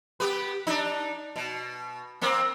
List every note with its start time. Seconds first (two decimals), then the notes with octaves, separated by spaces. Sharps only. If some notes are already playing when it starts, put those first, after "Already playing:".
0.20 B3 G4 B4
0.67 D4 D#4
1.36 B2
2.21 A#3 C4